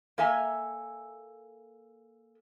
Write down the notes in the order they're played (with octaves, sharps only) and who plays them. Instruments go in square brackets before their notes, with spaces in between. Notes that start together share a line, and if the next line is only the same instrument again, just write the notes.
[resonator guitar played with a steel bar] A#3 A4 E5 G#5 A#5